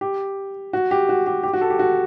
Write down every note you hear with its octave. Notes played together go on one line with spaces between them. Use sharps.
G4
F#4
G4
F#4
G4
G4
F#4
A4
G4
F#4